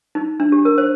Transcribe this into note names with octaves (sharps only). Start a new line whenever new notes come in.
D#4
D4
G4
A#4
C5